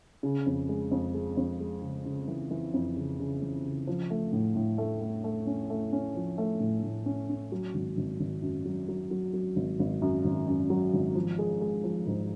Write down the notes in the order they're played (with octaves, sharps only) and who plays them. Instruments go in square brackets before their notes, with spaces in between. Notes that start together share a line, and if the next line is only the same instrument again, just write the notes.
[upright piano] C#3
F2
G#3
F2
G#3
F2
G#3
C#3
C#3
E3
E3
F2
C#3
C#3
E3
C#3
F3
A3
A2
A2
A3
A3
A3
C#4
A3
C#4
F3
A3
A2
A2
C#4
C#4
F#3
G#1
G#1
G#1
F#2
F#3
F#3
F#3
F#3
G#1
G#1
F#2
G#1
F#2
F#3
G#1
F3
G#3
G#3
F3
G#2